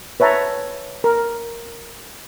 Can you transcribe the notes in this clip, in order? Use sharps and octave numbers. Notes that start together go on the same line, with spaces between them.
B4 C#5 E5 A5 A#5
A#4